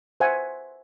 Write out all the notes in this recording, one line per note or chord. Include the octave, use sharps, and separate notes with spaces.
C5 E5 F#5 G#5